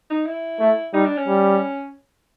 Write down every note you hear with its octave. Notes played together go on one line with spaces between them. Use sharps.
D#4
E4
A3
G3 D#4
D4
C#4
G3